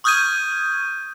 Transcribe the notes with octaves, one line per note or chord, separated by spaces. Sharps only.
C#6 D#6 F6 G6 G#6 D#7